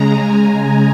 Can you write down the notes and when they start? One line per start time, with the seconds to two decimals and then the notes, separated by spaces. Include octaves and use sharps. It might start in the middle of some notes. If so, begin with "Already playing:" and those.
Already playing: C#3 G#3 A#5
0.09 G#5